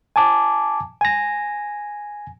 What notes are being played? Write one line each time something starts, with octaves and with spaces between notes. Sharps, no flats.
G#5 A5 D6
G#5 A#6